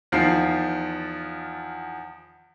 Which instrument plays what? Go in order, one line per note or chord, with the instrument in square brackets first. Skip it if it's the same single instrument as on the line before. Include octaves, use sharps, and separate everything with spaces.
[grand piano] E2 D#3 F3 C7